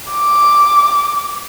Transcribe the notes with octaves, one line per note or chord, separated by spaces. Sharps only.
D6